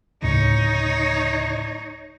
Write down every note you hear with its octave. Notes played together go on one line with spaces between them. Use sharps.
D2 A2 C#3 D#4 C#5